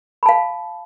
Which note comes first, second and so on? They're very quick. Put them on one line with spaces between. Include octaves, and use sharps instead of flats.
B5 A5 F5